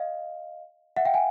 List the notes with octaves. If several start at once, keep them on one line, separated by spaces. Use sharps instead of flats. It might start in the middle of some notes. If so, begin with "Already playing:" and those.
Already playing: D#5 F5
E5 F#5
F5 G5
F#5 G#5